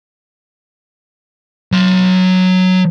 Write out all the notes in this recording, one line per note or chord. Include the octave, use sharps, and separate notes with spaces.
F#3 C6